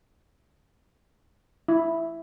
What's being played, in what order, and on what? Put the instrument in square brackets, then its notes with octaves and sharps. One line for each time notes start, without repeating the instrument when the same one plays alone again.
[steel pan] E4